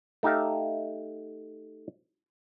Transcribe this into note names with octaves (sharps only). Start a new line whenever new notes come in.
A3 D#4 G4 E5 F5